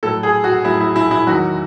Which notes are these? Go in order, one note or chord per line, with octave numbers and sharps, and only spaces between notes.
A2 F#3 A4
G#4
F#4
A2 F#3 E4
E4
E4
E4
E2 D#3 F#3 F#4